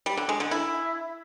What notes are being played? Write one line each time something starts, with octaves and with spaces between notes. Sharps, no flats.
G3
D3
G#3
D3
E4